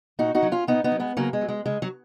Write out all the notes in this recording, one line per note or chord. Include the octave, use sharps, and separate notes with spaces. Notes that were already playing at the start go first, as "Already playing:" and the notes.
A#2 D#4 F#4
D#4 F#4
F#3
C#4 F4
A#2 B3 D#4
B3 D#4
F#3
G#3 B3
C#3 F#3 A#3
G#3
F#3
G#3
C#3 G#3
F#3